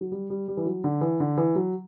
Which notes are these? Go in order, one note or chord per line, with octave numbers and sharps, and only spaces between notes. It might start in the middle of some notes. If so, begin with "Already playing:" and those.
F#3
G3
G3
G3
E3
F#3
D3
E3
D3
E3
F#3